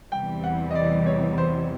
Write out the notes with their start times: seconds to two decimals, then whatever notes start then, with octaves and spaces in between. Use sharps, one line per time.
0.12 E2 C3 E3 G3 G5
0.44 F#5
0.71 D#5
0.75 D5
1.06 C#5
1.38 C5